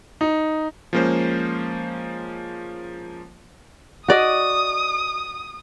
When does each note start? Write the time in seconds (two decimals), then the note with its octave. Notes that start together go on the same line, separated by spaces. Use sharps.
0.21 D#4
0.93 F3 G#3 A#3 C#4 C5
4.08 F#4 D5 D#5 D#6